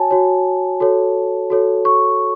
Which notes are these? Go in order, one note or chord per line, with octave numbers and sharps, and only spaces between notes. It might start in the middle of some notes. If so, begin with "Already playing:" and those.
Already playing: F#4 C#5 G#5 A5
F#4 C#5
F#4 A4 C#5
F#4 A4 C#5
C#6